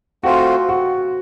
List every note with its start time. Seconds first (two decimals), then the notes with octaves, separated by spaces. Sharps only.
0.23 A3 C4 F4 F#4 C5
0.69 F#4